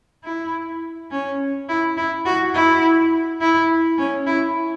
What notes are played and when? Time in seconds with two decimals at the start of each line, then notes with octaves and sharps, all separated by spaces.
0.24 E4
1.11 C#4
1.69 E4
1.97 E4
2.25 F#4
2.54 E4
3.41 E4
3.98 C#4
4.26 E4